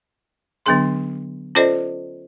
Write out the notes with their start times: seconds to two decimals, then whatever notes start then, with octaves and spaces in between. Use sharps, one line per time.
0.66 D3 F#3 B3 D4 G#4 C6
1.55 C#4 F4 A4 C5 D5 D#5